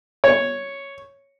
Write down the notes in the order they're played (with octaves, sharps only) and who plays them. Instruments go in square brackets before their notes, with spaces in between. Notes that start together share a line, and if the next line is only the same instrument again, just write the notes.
[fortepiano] C#5